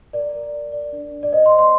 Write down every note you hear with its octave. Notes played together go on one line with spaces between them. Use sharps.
A#4 D5
A#4
D5
D5
D4
D4
D5
C5 D#5
C6
C5
C6